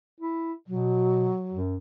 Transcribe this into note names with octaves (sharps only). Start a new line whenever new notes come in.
E4
B2 F#3
F#2